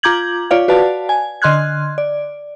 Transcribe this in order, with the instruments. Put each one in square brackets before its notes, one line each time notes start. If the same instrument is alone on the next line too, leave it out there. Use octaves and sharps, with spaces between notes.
[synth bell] F4 A#5 D6 G6 G#6 F#7
F4 C#5 D5 F5
F#4 B4 D5 F5 A5
G#5
D3 D#5 C6 F6 F#6 G#6
D5